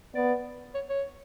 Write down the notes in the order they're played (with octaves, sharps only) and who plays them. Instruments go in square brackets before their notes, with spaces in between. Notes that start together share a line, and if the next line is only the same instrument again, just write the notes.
[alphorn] B3 [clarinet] D5
[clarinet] C#5
C#5